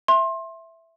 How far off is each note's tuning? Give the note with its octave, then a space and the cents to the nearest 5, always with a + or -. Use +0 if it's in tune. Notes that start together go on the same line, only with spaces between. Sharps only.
E5 +0 C6 +25